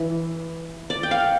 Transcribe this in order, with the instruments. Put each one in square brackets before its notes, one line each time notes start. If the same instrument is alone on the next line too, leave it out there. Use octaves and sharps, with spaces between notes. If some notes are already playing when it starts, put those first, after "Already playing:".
Already playing: [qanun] E3
D5
G5
F5